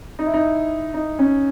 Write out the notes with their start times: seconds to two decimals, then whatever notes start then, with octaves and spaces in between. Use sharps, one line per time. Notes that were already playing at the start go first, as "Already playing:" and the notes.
0.19 D#4
0.26 E4
0.34 D#4
0.94 D#4
1.19 C#4